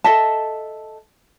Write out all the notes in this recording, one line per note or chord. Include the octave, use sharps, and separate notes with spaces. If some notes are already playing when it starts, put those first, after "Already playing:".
A4 D#5 E5 A5